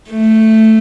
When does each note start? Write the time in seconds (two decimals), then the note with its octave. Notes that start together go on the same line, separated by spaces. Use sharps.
0.11 A3